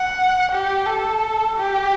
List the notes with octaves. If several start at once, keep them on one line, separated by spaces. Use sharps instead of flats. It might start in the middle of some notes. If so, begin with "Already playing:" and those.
Already playing: F#5
G4
A4
G4